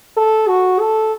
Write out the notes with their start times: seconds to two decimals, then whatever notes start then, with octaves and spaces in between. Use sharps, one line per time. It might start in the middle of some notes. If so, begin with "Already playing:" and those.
0.17 A4
0.48 F#4
0.80 A4